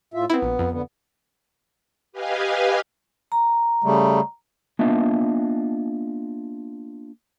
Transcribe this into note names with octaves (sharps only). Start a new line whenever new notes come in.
A2 F4 E5
B3 C4 E4
A#1
F2
D3 B3
G4 B4 D#5 F5 G#5
A#5
C#3 G3 A3
A#3 B3 D4 F4 D#5 E5